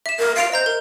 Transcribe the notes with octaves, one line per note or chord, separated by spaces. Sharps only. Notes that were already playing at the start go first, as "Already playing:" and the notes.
E5 E7
A#4
F5 C7 D7 F7
C5 D#5 A#5 G6
A#4